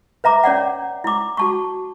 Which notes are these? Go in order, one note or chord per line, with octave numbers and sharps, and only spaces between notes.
B4 E5 A#5 D6
C#4 C#5 D5 F#5
E4 D6
F#4 A5 C#6